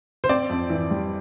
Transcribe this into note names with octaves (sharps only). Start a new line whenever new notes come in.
C5
C4 D5
F2
E3
G3